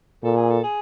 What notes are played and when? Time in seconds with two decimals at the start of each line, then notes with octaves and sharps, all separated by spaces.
0.23 A#2 A4
0.36 G#4
0.50 A4
0.63 G#4